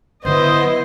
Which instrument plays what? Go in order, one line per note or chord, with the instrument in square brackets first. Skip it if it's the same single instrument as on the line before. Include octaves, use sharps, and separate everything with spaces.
[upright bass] D3 F#3 [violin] B3 [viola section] E4 D#5 [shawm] C5